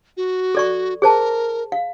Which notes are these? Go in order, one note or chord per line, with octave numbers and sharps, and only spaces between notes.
F#4
A4 D5 C#6
G#4 A#4 C5 A5
F5